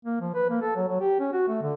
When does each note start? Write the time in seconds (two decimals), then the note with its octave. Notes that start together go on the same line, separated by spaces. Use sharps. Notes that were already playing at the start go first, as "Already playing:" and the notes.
0.05 A#3
0.21 F3
0.34 B4
0.50 A#3
0.61 A4
0.76 F#3
0.88 F#3
1.01 G4
1.20 C#4
1.33 F#4
1.48 A3
1.62 D3